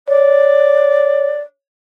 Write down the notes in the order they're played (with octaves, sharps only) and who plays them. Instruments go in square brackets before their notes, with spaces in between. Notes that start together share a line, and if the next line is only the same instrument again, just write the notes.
[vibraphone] C#5 [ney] D5